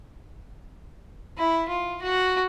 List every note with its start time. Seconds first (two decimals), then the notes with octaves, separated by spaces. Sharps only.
1.38 E4
1.68 F4
2.02 F#4